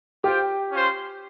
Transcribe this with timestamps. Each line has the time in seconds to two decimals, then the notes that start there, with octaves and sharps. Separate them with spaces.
0.24 F4 G4 C5 G5
0.72 C#4 F4 C5